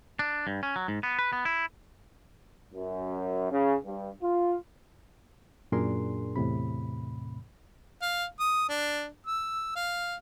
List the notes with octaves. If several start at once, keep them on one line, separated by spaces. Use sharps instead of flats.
D4
G2
C#4
F#3
G#2
B3
B4
B3
E4
F#2
C#3
G2
F4
F#2 A#2 D4 G#4 A#4 C6
E2 A2 C3 B5
F5
D#6
D4
E6
F5